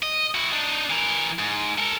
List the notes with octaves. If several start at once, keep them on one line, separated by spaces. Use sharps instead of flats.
D#5
E4 F#4
D4 D#4
E3 A#4
G#2
A4 A#4